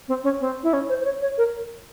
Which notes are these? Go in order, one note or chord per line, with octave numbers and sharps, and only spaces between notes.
C4
C#4
C4
E4
C#4
C5
C5
C#5
C#5
A#4